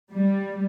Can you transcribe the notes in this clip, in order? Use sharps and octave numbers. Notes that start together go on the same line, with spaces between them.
G3